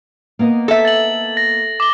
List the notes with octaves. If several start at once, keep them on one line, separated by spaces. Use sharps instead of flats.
A#3 B3 D#5
A4 E5
A6 F#7
A#6
D6 G7